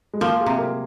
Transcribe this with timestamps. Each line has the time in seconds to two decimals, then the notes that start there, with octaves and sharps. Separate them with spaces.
0.14 G#3
0.21 F3 A#3
0.41 G#4
0.46 C3
0.58 A#4